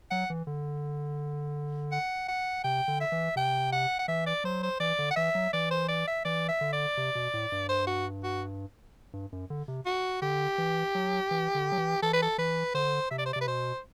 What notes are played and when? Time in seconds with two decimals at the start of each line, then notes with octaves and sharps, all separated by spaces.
0.11 F#3 F#5
0.30 E3
0.47 D3
1.92 F#5
2.28 F#5
2.64 C3 G5
2.88 D3
3.01 E5
3.12 E3
3.36 C3 G5
3.72 F#5
3.99 F#5
4.08 E3 E5
4.26 D5
4.44 F#3 C5
4.63 C5
4.80 E3 D5
4.99 D3
5.11 F#5
5.16 E3 E5
5.35 F#3
5.53 E3 D5
5.71 C5
5.88 D5
6.07 E5
6.25 E3 D5
6.48 E5
6.61 D3
6.73 D5
6.97 C3
7.15 B2
7.33 A2
7.52 G2
7.69 C5
7.87 F#4
8.24 F#4
9.13 G2
9.32 F#2
9.50 D3
9.68 C3
9.86 F#4
10.22 D3 G4
10.58 E3
10.95 F#3
11.31 E3
11.55 D3
11.72 F#3
11.78 E3
12.02 E3 A4
12.13 B4
12.22 A4
12.38 E3 B4
12.74 D3 C5
13.11 C3 E5
13.19 D5
13.26 C5
13.33 C3 D5
13.41 B4
13.47 B2 C5